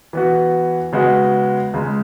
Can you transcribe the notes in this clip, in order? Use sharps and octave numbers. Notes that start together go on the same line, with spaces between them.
E3 B3 F#4
C#3 G#3 B3 F#4
C#2 C#3 G#3